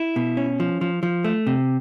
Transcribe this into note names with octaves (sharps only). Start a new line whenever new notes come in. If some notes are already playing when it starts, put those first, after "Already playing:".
Already playing: E4
B2
C#4
F3
F3
F3
A3
C3